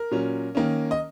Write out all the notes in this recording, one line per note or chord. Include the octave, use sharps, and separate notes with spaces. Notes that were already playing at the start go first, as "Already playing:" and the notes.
Already playing: A#4
A#2 F#3 C#4
D#3 A#3 C#4
D#5